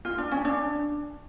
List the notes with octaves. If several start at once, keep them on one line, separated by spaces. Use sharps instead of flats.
F4
D4
C#4
D4